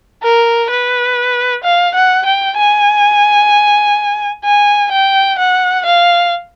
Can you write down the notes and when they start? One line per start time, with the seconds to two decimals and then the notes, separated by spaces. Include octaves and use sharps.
0.23 A#4
0.70 B4
1.64 F5
1.95 F#5
2.26 G5
2.58 G#5
4.45 G#5
4.92 G5
5.39 F#5
5.86 F5